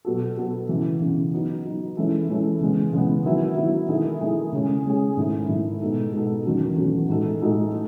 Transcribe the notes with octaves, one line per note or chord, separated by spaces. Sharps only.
B2 F#3 B3 F#4 A4
B2 F#3 B3 F#4 A4
C#3 E3 B3
C#3 E3 B3
F#3 B3 D#4
F#3 B3 D#4
E3 G#3 C#4 E4 A4
E3 G#3 C#4 E4 A4
C#3 E3 G#3 B3
C#3 E3 G#3 B3
D#3 F#3 B3 E4
D#3 F#3 B3 E4
D#3 A3 E4 G#4
D#3 A3 E4 G#4
C#3 G#3 C#4 G#4
C#3 G#3 C#4 G#4
G#2 D#3 A3 E4
G#2 D#3 A3 E4
B2 G#3 B3 D#4 A4
B2 G#3 B3 D#4 A4
E2 D#3 F#3 A3 C#4
E2 D#3 F#3 A3 C#4
A2 G#3 D#4 F#4 A4
A2 G#3 D#4 F#4 A4
A3